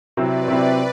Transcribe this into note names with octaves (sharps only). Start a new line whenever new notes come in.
C3 F#3 C4 E4 B4 D5
C3 F#3 C4 E4